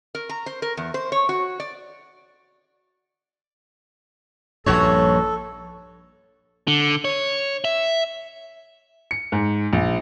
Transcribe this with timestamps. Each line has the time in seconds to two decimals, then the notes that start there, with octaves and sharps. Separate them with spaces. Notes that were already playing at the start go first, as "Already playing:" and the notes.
0.15 A#4
0.29 A#5
0.46 C5
0.62 A#4
0.77 E2
0.94 C5
1.12 C#5
1.29 F#4
1.60 D5
4.66 A#1 G2 F#4 A4 C#5
6.68 D3
7.05 C#5
7.65 E5
9.11 C#7
9.32 G#2
9.73 A#1